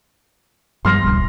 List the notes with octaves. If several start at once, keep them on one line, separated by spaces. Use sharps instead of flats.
G2 F3 G3 C6 F6 A#6
D1 A#1 G2